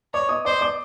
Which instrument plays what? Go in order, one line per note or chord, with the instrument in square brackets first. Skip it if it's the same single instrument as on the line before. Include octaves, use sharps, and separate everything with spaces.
[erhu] C#5 [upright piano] D5 D6
[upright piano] D#5 D#6
[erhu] C5 [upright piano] D5 D6
[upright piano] D5 D6